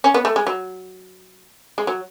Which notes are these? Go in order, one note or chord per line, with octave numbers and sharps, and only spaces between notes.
C#4
B3
A3
G#3
F#3
G#3
F#3